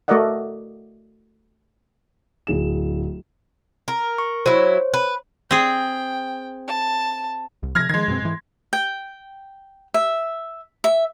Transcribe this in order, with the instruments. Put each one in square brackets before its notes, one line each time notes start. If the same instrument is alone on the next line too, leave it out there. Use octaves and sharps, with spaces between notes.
[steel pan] A3 F#4 A#4 D5 D#5 F#5
[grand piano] D1 G#4 E7
[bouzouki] A#4
[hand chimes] C#6
[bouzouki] F#3 E4 [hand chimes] C5 C#5
[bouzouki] B4
[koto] C4 G#4 [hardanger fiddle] G5
[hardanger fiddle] A5
[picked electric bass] C2
[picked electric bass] C3 F3 [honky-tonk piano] F6 G#6 A#6
[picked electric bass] D#3 F3 [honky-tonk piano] G#3 G#6
[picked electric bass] F#2 B2 C4
G#2 E3
[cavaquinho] G5
E5
E5